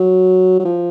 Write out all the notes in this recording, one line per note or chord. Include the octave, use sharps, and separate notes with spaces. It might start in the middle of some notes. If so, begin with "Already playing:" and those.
Already playing: F#3
F#3
F3